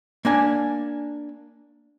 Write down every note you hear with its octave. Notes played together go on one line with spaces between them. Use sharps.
A#3 D4 G#5